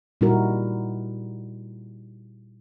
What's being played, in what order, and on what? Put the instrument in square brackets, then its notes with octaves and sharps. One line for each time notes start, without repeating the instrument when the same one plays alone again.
[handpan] A#2 G3 D#4 E4 F#4 A#4